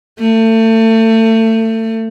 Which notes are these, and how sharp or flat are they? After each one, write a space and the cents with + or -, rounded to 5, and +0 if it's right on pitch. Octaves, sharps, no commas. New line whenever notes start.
A3 +30